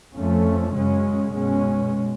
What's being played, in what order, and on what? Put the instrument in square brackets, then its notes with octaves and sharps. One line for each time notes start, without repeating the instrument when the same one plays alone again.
[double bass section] F2 F3 A3 C#4
F#2 C#3 G#3 C#4
B2 G#3 C#4